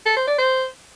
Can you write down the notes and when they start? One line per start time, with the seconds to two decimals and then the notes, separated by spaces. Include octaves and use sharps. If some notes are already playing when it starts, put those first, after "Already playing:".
0.06 A4
0.17 C5
0.27 D5
0.38 C5